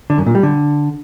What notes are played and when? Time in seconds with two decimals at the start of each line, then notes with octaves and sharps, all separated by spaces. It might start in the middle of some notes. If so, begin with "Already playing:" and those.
0.10 D3
0.18 F#2
0.26 A#2
0.35 G3
0.43 D3